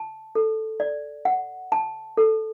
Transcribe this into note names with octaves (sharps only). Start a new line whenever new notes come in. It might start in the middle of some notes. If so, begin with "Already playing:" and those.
Already playing: A5
A4
D5
F#5
A5
A4